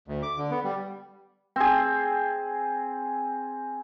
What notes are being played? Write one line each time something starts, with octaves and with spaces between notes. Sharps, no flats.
D2
D6
D3
B3
G3
C4 G#4